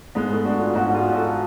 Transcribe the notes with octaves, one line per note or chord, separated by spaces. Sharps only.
G#2 G#3 B3
A3
D4 F#4
F4 G#4
G#2 D4 F#4
F4 G#4
F#4 A4